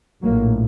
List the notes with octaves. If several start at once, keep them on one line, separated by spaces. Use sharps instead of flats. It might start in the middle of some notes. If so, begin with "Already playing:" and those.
A#1 A2 F#3 A#3